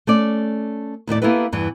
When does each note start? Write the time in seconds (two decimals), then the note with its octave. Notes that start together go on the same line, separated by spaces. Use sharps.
0.07 A3 C#4 D5
1.07 D#2 A2 A3 D5
1.22 A#3 B3 E4 G4 A4 B4
1.52 E2 G2 E3